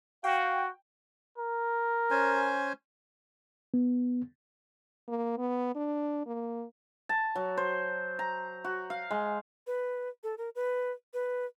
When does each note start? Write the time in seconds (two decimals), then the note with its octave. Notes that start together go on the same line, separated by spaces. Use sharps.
0.24 F#4 F5 G5
1.38 A#4
2.11 C#4 C5 G#5
3.74 B3
5.08 A#3
5.38 B3
5.75 D4
6.27 A#3
7.09 A5
7.35 F#3
7.57 C5
8.19 A#5
8.65 F#4
8.90 F5
9.11 G#3
9.67 B4
10.24 A4
10.38 A#4
10.55 B4
11.14 B4